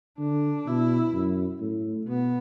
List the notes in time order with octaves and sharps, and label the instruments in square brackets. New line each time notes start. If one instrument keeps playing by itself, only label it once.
[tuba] D3 [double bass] D4
[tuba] B2 [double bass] E4
[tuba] F#2
A2
[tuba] B2 [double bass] B3